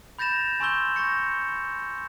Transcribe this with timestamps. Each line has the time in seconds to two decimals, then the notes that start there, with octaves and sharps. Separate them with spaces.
0.19 B5 G6 A6 A#6 E7 F7
0.60 G#5 C6 C#6 E6 G6 G7
0.96 C#6 G6 A#6 C#7